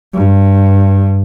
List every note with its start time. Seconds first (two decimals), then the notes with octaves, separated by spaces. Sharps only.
0.14 G2